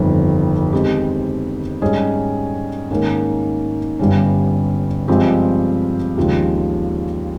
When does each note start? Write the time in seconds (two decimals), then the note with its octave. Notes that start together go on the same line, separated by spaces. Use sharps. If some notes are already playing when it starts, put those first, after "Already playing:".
Already playing: G1 F2 D#3 G3
0.73 D#3 G#3 C4 G4
1.82 G#2 G3 C#4 G#4 D#5
2.91 G#2 D#3 A#3 C#4
3.99 G1 G2 G3 C#4
5.08 G2 F3 G#3 C4 G4
6.17 D#2 C#3 F3 G#3